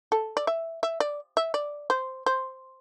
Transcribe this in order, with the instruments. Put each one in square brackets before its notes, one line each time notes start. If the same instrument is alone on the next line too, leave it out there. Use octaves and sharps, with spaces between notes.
[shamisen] A4
D5
E5
E5
D5
E5
D5
C5
C5